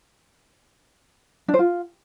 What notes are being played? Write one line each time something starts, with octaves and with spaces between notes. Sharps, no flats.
D4
C5
F4